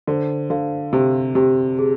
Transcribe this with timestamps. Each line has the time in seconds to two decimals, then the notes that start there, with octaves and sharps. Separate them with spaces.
0.07 D3 C5
0.50 D3 F5
0.93 C3 G4
1.35 C3 G4
1.79 G#4